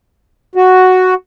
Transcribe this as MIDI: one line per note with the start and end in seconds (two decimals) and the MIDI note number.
0.55 1.14 66